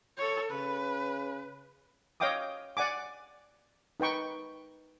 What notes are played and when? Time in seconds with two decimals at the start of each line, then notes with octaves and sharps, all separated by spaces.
0.17 A4 C#5
0.51 C#3 B4
2.20 C#5 D#5 F5 G5 D6 D#6
2.77 D5 F#5 G#5 D6
4.00 D#4 B4 G5 C#6